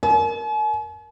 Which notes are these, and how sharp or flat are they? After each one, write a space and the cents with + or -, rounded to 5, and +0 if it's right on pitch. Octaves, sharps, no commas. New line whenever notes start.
A#4 +0 G#5 +45